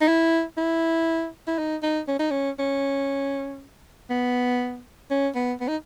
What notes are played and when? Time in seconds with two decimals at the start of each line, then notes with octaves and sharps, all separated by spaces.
0.01 D#4
0.08 E4
0.57 E4
1.47 E4
1.59 D#4
1.83 D#4
2.08 C#4
2.19 D#4
2.31 C#4
2.59 C#4
4.10 B3
5.10 C#4
5.35 B3
5.61 B3
5.68 D#4